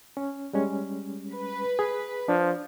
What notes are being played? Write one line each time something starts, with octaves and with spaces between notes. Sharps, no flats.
C#4
G3 G#3 C#4
B4
G#4
F3 D4